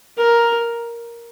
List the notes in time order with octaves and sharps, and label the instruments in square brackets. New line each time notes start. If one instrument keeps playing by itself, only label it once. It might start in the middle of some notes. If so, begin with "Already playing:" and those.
[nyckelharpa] A#4